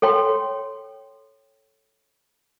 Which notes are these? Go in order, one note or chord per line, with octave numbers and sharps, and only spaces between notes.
A4 C#5 G5 C6